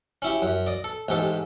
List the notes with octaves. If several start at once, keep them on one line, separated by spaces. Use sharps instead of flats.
C#4 E4 G4
F#2
D5 D#5
A4
A1 G#2 G4 A4